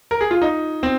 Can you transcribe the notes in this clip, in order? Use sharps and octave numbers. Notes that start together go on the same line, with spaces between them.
A#4
G#4
F4
D#4
C4